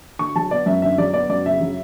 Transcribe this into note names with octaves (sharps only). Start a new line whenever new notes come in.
D3 C#6
F#3 A5
B3 D5
F#2 E5
D3 E5
F#3 D5
B3 D5
F#2 D5
C#3 E5
F#3